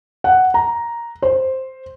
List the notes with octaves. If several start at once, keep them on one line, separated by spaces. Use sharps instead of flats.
F#5
A#5
C5